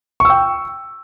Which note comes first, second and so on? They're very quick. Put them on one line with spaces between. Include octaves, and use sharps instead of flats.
C#6 E6 G5